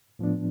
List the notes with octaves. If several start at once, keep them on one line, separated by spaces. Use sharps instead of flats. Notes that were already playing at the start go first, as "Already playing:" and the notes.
A2 F3 B3 D4